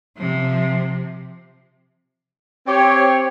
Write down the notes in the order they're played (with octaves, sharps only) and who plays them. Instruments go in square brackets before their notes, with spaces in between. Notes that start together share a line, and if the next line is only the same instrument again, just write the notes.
[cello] C3 F3
[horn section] C4 G4 C#5